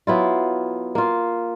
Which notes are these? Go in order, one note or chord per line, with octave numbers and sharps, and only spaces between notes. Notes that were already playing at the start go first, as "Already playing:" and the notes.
F#3 B3 E4 F4
A#3 F4